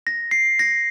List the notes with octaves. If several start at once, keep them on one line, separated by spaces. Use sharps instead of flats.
A#6
C7
A#6